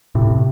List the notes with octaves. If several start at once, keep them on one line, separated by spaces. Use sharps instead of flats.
A2 C3